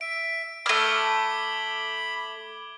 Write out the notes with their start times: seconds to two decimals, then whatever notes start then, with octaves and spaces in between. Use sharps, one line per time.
0.01 E5 D7
0.66 A3 B5 D6 F6 G#6 G7